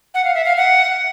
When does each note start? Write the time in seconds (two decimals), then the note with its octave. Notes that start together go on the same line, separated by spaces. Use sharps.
0.14 F#5
0.24 F5
0.34 E5
0.44 F5
0.57 F#5